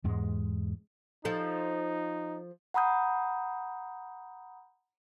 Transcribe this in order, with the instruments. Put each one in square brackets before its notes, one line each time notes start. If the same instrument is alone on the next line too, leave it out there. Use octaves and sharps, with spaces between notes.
[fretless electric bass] E2 G#2 G#3
[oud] F3 A4 [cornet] D#4
[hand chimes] F#5 A#5 B5 D#6 G6